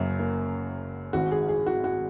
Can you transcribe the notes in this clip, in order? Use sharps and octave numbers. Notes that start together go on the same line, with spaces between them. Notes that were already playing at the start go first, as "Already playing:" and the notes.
Already playing: F#1 F#2 F#3 A#3
A#3
G#1 G#2 G#3 F#4
G#4
G#4
F#4
F#4